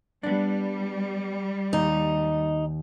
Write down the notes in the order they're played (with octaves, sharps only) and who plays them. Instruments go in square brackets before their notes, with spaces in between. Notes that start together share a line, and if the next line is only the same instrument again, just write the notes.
[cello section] G3 [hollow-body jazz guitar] B3 D4
[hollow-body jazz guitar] D#2 [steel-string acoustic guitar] D#4